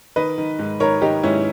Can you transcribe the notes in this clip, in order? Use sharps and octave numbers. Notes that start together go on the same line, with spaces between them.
D#3 B4 D#5
D#3
G#2
D#3 A#4 C#5
D#3 D#4 G4
G#2 C#4 E4